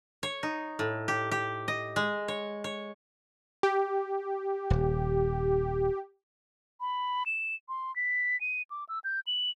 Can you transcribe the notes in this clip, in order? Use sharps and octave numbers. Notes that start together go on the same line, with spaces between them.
C#5
D#4
A2
G4
G4
D#5
G#3
C#5
C#5
G4
D#1
B5
E7
C6
B6
D#7
D6
E6
G6
F#7